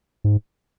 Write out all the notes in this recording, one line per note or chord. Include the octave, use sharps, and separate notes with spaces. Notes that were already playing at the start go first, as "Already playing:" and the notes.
G#2